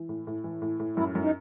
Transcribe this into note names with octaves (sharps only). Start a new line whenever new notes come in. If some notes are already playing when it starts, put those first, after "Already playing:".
Already playing: E3
A2
A2
E3
A2
A2
F#2 E4
F#2
D#4